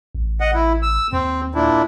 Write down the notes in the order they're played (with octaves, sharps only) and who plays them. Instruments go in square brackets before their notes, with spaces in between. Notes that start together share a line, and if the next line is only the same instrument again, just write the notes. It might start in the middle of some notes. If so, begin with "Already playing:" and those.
[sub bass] A1
[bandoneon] D#5 F#5
E4
E6
[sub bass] D#2 [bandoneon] C4
[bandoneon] A#2 D4 E4